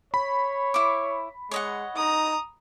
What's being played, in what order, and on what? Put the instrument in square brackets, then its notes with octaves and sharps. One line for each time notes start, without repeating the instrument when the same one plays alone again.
[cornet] C#5 [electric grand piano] B5
[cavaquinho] E4 D6
[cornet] G#3 [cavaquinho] C#5 D#5 F#5
[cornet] D#4 [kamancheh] A#5 D#6